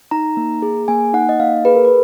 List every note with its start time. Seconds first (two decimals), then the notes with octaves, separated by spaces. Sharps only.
0.11 D#4 A#5
0.37 A#3
0.62 G#4
0.88 A#3 G#5
1.13 D#4 F#5
1.29 D#5
1.39 A#3 F5
1.65 G#4 B4
1.75 A#4
1.85 B4